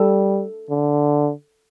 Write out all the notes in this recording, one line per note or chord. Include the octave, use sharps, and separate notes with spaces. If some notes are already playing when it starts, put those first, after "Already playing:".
Already playing: G3 A4
D3